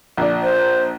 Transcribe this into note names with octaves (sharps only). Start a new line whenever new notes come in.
A#1 D4
C5